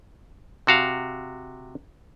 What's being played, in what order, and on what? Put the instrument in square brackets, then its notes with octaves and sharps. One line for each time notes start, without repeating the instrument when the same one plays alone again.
[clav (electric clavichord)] C3 F#4 F5